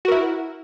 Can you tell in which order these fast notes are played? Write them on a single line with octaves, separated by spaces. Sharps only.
F#4 A#4 E4